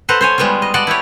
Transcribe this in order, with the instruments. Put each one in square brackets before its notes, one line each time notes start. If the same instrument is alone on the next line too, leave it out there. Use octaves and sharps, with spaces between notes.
[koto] A4 B4 C5 F#5 A5 A#5
C5 C#5 G#5
G3 G#3 B3 D#4 F4
D#5
D5 D#5 F#5 A5
E4 G4 B4 C#5